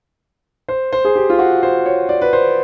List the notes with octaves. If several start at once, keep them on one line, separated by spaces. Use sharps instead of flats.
C5
C5
G#4
G4
F4
F#4
C5
C#5
D5
B4
C5